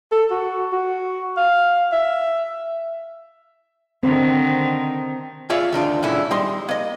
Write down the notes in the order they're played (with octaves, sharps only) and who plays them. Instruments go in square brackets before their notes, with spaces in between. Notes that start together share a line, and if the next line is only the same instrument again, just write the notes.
[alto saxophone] A4
F#4
F#4
F5
E5
[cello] D3 D#3 [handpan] C4
[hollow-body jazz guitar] F4 G#4 C#5 D5 E5 F5
D2 D#3 D4 F4
C#2 A#2 D3 C#4 E4
G3 D#4 C6
A#3 D#5